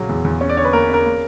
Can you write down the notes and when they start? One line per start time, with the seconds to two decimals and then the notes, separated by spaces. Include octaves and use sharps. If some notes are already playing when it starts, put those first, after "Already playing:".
Already playing: A#2 C#3 F#3
0.09 E2
0.25 E2
0.41 C#4
0.50 D5
0.57 D3 C#5
0.65 B4
0.73 A#3 A#4
0.89 C#4 A#4
1.06 A#3